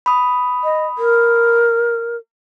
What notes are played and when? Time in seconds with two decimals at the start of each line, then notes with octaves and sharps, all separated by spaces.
0.06 B5 D#6
0.64 D#5
0.98 A#4